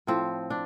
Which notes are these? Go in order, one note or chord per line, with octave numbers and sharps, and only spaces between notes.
A2 F3 C4
D4